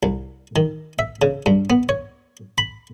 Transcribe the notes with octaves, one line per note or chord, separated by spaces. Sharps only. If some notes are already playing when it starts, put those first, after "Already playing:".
C2
D#3
E5
C#3
G2
B3
C#5
B5